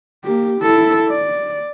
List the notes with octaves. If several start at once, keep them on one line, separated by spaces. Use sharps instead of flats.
A#3 G4
E4 A4
D5